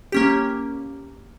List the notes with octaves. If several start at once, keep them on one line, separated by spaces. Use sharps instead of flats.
A#3 C#4 G4